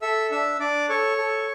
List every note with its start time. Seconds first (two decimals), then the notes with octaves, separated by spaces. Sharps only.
0.02 A4 E5 E6
0.31 D4 E5 E6
0.59 D4 D5 D6
0.89 A4 C#5 C#6
1.18 A4